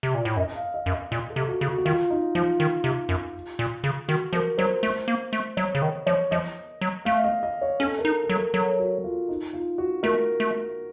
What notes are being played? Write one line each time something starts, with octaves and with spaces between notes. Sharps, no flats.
C3
A#2
A2
F#2 D#5
F5
D#5
F#2
D#5
A#2 D#5
A4
C3
F#4
C#3
F#4
F#4
D#3 F4
D#4
F3 F4
D#3
C3
F#2
A#2
C#3
D#3 F#4
F3 A#4
F#3 C5
A3
A#3
A3
F#3 C#5
C#3
D#3 D#5
F3 C#5
F3 D#5
F#3
A3 F5
D#5
D#5
C#5
C#4 A4
A#4
D#4
A4
F#3
A#4
F#3 A4
F#4
F4
D#4
F4
F#4
A3 A#4
A3